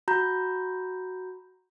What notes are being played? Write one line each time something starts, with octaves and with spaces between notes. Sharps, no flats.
F#4 A#5 B5 G6